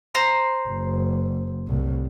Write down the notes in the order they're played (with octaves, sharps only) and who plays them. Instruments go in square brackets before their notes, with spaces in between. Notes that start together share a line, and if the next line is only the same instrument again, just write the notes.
[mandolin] C5 A#5 C6
[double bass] F#1
C2 A2